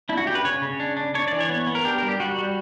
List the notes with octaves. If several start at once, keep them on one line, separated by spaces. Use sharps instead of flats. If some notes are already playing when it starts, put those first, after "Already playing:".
D4 E4
F#4
C#3 G4
B4
C#3 C#5
C#3
D4
D4
D4 C#5
E3 D5
C#5
B3
B3
A#4
D4 G4
G3 A#4
G4
G3 F#4
G3